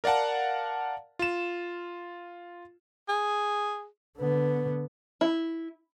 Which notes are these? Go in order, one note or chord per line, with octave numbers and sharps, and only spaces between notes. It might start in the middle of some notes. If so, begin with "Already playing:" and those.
A#4 D5 F5 F#5 A5
F4 E7
G#4
D3 B3
E4